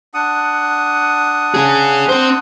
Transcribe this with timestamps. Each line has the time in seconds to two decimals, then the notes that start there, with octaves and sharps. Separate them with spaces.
0.14 D4 F#5 D#6
1.54 C#4 G#4
2.09 C4 C5